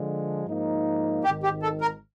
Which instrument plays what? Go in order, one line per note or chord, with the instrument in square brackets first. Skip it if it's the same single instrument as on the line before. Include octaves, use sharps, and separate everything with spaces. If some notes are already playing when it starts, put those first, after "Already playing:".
Already playing: [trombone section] D3 F3 G#3
G#2 F3 A#3 D#4
[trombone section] G#1 G#2 D#3 [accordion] G4
[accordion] G4
A4
A#4